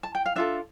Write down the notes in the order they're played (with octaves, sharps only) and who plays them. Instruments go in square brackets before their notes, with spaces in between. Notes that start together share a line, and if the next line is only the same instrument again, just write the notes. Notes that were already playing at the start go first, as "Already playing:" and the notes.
[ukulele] A5
G5
F5
D4 F4 A4 E5